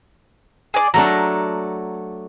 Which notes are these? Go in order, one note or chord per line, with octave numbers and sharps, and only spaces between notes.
G#4 D5
F#3 A3 D4 A#5